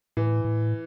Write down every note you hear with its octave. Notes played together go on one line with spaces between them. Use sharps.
A2 E3
A2